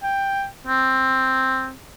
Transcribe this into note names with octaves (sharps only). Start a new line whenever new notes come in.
G5
C4